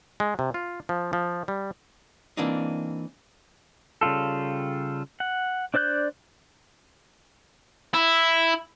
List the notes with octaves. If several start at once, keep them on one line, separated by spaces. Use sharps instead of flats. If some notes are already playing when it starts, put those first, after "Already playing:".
G#3
C3
F4
F3
F3
G3
E3 A#3 C4 D4 D#4
C#3 G3 F4 A4
F#5
D4 C5 D5 F#6 G6
E4